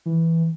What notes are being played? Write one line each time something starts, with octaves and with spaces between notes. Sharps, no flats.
E3